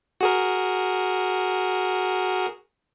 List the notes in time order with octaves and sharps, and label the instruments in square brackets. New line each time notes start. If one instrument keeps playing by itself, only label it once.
[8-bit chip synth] F#4 G#4 A#4